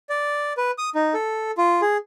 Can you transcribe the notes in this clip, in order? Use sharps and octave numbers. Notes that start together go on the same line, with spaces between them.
D5
B4
D#6
D#4
A4
F4
G#4